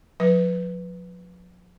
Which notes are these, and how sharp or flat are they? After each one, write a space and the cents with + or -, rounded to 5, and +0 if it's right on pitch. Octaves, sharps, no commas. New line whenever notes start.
F3 +45 B4 +0